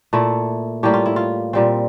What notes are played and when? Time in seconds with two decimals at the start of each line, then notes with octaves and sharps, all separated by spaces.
0.13 A#2 A3 E4
0.83 A2 G3 A#3 G4
0.94 F4
1.06 E4
1.16 F4
1.53 A#2 G3 C4